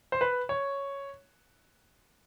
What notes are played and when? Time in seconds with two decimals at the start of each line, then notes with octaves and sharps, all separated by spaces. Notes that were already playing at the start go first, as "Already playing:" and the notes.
0.12 C5
0.21 B4
0.49 C#5